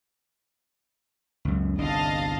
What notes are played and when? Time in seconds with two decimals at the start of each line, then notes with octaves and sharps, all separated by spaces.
1.45 C#2 F#2
1.79 G1 C2 D4 D#5 F5 A5